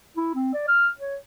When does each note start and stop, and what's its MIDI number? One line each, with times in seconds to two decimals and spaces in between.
0.17 0.31 64
0.35 0.52 60
0.54 0.64 74
0.68 0.87 89
0.99 1.16 73